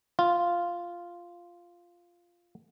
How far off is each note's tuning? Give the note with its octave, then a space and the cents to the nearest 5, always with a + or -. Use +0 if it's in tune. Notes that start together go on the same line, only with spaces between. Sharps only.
F4 -5